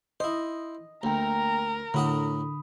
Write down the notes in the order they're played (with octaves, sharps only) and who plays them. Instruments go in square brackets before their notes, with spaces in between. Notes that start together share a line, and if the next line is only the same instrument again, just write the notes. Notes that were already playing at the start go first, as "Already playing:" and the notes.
[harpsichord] E4 C5 [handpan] D#5
[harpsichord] D2 [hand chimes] A#3 G5 [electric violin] A#4 A#5
[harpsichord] A2 F#4 F#5 [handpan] D3 [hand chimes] B5 D#6